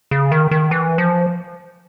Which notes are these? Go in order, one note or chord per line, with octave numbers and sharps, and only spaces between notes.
C#3
D#3
D#3
E3
F3